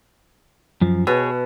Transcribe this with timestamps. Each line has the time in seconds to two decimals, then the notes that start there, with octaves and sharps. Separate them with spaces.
0.81 F#2 F3
1.07 B2 G#4 C#5